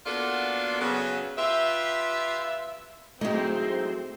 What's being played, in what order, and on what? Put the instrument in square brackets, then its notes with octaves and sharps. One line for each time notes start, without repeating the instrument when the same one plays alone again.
[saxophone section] A#3 B3 D4 F4 F#4 A4
C#3 F#3 B3
F4 G4 B4 E5
[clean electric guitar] A2 E3 F#3 [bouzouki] G#3 D#4 [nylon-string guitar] A3 [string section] C4